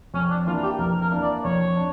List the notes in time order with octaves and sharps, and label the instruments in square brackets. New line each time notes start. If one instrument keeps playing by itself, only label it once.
[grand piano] F2 [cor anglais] C#4
[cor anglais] D4
[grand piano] E3 A#3 D4 [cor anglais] F4
[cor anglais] G4
[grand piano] F2 [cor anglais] A#4
[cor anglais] A#4
[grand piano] E3 A#3 D4
[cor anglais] D5
[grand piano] F2 [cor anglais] C#5
[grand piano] D4